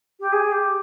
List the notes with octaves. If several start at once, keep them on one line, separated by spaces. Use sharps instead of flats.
G4
G#4
G4